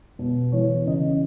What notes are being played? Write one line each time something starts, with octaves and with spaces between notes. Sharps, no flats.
B2
E3 C#5
C#3 D#5